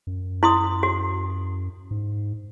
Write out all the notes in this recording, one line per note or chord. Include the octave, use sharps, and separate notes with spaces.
F#2
E4 C6 D#6
F#4
G#2